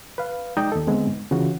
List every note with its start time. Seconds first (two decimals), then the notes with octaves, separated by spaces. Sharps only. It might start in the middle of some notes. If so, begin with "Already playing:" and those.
0.18 B4 F5
0.57 G#3 D#4 D5 D#5 G5
0.72 D#2 A4
0.87 D3 G#3 B3 C4
1.07 G#2
1.31 C#3 E3 F4 F#4